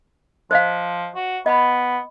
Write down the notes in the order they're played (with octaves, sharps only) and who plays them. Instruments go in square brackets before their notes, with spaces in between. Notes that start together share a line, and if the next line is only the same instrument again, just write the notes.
[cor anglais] F3 [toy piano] C5 D#5 F5
[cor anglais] F#4
[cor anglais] B3 [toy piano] D#5 B5